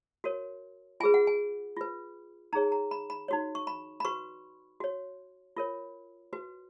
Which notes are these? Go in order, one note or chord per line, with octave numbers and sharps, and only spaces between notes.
F#4 A#4 C#5
F4 G#4 B4 G#5
F#5
G#5
F4 B4
D#4 G#4 C#5 A#5
A#5
B5
B5
D#4 F#4 C#5
C#6
B5
B5
F#4 B4 C#6
F#4 C#5
F4 A#4 C#5
F#4 B4